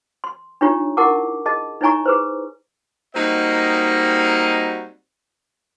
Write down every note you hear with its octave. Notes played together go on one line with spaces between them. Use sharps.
C6
D4 D#4 F4 G4 C#5 A#5
E4 G4 A#4 F#5 A5 D6
G#4 D#5 A5
D#4 E4 C#5 G#5 A#5 C#6
G#4 B4 C5
G3 A#3 C4 D#4 F#4 D#5